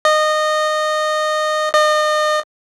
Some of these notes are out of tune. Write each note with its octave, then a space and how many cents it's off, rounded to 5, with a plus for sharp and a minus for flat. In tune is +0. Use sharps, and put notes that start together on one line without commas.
D#5 -20
D#5 -35